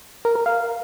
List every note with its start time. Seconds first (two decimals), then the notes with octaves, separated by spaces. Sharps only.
0.25 A#4
0.35 A#4
0.46 F5